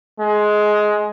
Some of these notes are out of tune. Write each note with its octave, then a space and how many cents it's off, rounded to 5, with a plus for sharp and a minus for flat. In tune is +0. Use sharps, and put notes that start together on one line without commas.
G#3 +15